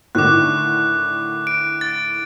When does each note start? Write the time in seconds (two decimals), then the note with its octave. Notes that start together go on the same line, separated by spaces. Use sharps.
0.15 A2 D3 D#3 D6 F#6
1.47 D7
1.81 A6